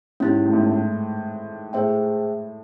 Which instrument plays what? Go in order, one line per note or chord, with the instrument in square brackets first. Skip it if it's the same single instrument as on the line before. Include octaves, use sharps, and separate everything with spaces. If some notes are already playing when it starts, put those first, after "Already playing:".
[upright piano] G#2 [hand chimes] C#4 E4 G4
[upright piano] A2
G#2
A2
A2
[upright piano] A2 [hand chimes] G#4 C5 E5 G5